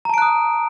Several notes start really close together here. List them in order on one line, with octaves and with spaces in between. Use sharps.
A#5 A5 D7 F#6 D#6